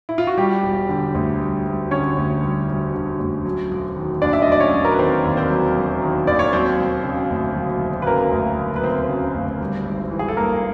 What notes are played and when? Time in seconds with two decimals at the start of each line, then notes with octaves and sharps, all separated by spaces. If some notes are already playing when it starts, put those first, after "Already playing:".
0.09 E4
0.18 F4
0.27 F#4
0.37 G3 G4
0.63 E1
0.89 D3
1.14 D2
1.40 G3
1.66 E1
1.91 D3 C#4 C#5
2.17 D2
2.42 G3
2.68 E1
2.94 D3
3.20 D2
3.45 F#3
3.71 E1
3.96 D#3
4.22 D#2 D4 D5
4.33 E5
4.42 D#5
4.47 F#3 D5
4.60 C#4 C#5
4.73 E1
4.85 A#4
4.92 B4
4.98 D#3 C4 C5
5.24 D#2
5.37 C4 C5
5.50 F#3
5.76 E1
6.02 D#3
6.27 D#2 D5
6.39 C#5
6.52 F#3 C4 C5
6.79 E1
7.04 C#3
7.30 D2
7.55 F#3
7.81 E1
8.02 B4
8.06 C#3 A#3 A#4
8.32 D2
8.58 F#3
8.76 B4
8.83 E1 C4 C5
9.09 C#3
9.34 D2
9.60 G3
9.85 G#1
10.11 E3
10.19 G#4
10.28 A4
10.37 G2 A#3 A#4